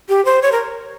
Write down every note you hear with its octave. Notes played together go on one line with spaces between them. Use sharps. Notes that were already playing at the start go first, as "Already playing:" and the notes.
G4
C5
C#5
A#4